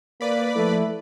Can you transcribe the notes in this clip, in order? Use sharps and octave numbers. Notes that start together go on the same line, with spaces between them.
A#3 B4 D5 B5
F3 A3 E4